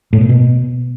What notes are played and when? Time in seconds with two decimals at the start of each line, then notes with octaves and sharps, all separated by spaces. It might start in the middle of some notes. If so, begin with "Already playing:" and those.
0.13 A2
0.21 A#2
0.29 B2